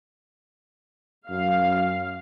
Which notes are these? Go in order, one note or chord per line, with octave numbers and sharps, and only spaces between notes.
F#2 F5